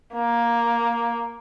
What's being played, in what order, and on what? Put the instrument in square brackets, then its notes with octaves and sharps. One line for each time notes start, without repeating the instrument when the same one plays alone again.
[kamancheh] A#3